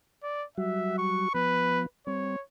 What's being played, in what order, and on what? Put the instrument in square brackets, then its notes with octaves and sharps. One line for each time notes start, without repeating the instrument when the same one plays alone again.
[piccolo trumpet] D5
[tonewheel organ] F#3 G3 F#4 [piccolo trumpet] E5
[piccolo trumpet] C#6
[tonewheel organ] F3 B3 [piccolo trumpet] B4
[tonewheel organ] G3 C4 [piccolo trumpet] C#5